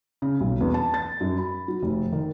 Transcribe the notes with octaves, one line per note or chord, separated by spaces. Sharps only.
C#3
B1
E2
A5
A6
F#2
B5
F#3
F1
D#3